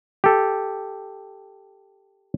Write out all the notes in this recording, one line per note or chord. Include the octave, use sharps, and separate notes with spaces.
G4 A4